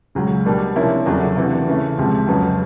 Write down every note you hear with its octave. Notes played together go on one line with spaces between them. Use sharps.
C#2 C#3 F#3
B2 G3 A#3 D4
C3 F3 A#3 C#4 E4
E2 C#3 F#3 A3 D4
C3 E3 A3
C#3 E3 A3
C#2 C3 F3
F2 C#3 F#3 B3